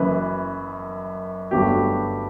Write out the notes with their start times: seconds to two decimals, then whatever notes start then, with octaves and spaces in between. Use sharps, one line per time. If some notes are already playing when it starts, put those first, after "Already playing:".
Already playing: F#1 F#2 E3 B4
1.51 G1 G2 F#3 A3 G4